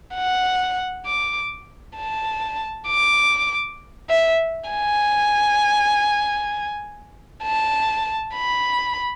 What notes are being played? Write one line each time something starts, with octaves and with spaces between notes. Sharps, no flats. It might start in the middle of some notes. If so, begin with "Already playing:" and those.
F#5
D6
A5
D6
E5
G#5
A5
B5